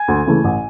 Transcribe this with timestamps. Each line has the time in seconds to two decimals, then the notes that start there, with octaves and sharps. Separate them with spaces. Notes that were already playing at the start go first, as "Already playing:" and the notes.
Already playing: G#5 G#6
0.08 D2
0.27 C#3 E3 A3
0.44 A1